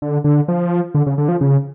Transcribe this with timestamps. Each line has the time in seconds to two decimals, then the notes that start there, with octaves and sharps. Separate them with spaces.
0.02 D3
0.24 D3
0.48 F3
0.95 D3
1.07 C#3
1.18 D3
1.28 F3
1.41 C#3